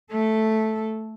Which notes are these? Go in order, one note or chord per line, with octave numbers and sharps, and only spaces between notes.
A3 A4